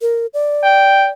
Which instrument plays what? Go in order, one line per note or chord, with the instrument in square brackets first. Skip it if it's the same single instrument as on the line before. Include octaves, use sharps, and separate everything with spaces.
[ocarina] A#4
D5
[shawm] G5